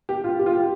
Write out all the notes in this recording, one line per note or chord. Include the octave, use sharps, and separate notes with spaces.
G4
F4
G4
F4
G4